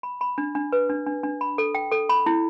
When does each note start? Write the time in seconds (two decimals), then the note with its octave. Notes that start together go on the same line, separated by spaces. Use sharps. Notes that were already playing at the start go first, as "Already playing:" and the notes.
0.03 B5
0.21 B5
0.38 D4
0.55 D4
0.73 B4
0.90 D4
1.07 D4
1.23 D4
1.41 B5
1.58 A4
1.75 G5
1.92 A4
2.09 B5
2.26 E4